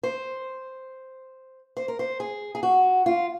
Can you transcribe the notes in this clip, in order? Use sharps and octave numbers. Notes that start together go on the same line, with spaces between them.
C5
C5
A#4
C5
G#4
G#4
F#4
F4